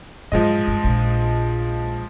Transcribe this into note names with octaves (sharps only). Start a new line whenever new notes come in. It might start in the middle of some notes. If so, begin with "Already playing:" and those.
G#2 F3 F#3 G#3 D#5
G2
A#1